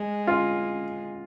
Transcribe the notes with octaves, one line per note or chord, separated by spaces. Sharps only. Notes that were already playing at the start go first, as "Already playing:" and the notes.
Already playing: G#3
F4